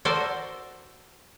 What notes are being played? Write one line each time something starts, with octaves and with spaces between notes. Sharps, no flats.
F#4 A4 A#4 C5 D5